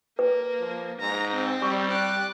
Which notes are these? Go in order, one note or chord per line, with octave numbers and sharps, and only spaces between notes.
A#3 B4
F3
G#2 A#5
C4
G3 C#6
D5 F#6